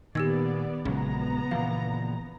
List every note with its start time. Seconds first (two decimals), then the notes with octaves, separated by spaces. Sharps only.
0.15 A#2 D#3 B3 G4 D5 E6 G#6
0.85 A#1 C#3 F#3 G#3 B3 A#5
1.51 A#2 E3 F3 F5